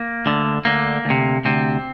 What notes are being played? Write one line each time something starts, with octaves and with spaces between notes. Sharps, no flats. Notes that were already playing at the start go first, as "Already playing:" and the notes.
Already playing: A#3
D2 D3
D2 D3 A#3
D2
C3
D2 C3 C4